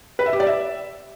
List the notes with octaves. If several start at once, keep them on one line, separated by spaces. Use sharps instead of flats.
B4
E5
G4
D5
E5